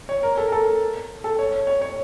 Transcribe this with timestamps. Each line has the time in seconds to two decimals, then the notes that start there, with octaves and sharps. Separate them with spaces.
0.09 C#5
0.23 A#4
0.37 A4
0.48 A#4
0.52 A4
1.24 A4
1.39 C#5
1.67 C#5
1.82 C#5